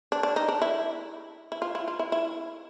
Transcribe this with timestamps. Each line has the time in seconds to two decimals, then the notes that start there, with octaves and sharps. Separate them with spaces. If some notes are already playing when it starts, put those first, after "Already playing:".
0.12 D4
0.23 D4
0.36 D#4
0.48 D4
0.62 E4
1.52 E4
1.62 F4
1.75 E4
1.88 F4
1.99 E4
2.12 E4